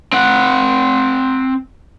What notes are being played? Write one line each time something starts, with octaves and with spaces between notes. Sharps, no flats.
C4 F#5